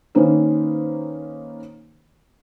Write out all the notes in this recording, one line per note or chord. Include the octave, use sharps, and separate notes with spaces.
D#3 A#3 C#4 D#4 B4 C5